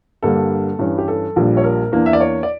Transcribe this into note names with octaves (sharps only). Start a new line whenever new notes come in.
G2 D3 G3 A#3 A4
G2 E3 G3 C#4
G4
A4
A#1 A#2 G3 A#3 D4
C#5
A#4
E2 E3 A#3 D4
E5
D5
C#5
D5